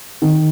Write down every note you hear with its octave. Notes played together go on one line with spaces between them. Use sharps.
D#3